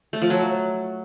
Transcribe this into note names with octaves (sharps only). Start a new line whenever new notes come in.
A3
F3
F#3